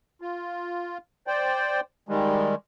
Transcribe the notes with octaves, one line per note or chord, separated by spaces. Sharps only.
F4
C5 D5 G5
D#3 G3 G#3